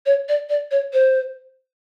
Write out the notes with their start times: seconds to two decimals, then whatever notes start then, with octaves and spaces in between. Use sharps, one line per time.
0.06 C#5
0.29 D5
0.49 D5
0.71 C#5
0.93 C5